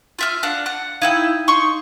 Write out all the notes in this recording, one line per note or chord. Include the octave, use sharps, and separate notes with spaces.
F4 E5 F6
D4 F5 F#5
F#5
D#4 E4 F5 G5 G#6 D#7
D#4 C6 C#6